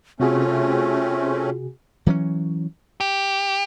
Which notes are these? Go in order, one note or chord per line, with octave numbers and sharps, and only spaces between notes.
C3 A3 C4 C#4 F4 F#4 G#4
E3 F#3 C4 C#4
G4